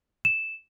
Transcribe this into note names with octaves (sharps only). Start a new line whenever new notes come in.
E7